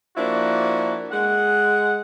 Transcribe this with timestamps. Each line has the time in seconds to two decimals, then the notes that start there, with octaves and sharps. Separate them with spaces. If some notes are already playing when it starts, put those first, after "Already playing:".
0.17 F3 A#3 D4 E4 F#4
1.12 G#3 F#5